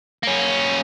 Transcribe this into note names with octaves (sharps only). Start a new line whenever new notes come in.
A#3 C#4